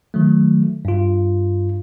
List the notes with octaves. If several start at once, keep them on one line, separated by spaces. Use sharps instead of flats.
D#3 F#3 A3
G2 F4